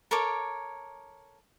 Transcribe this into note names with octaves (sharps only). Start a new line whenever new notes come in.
A4 A#4 C#5 D6